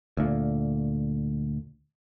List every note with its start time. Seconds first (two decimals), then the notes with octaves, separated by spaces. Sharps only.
0.17 D2 A#2